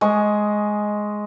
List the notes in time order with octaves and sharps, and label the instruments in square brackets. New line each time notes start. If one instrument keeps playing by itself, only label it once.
[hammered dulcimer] G#3 D#5 C#6